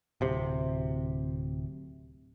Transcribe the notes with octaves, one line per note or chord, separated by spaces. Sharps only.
D1 C3